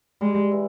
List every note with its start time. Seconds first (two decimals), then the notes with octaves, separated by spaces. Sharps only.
0.21 G3 G#3
0.52 E3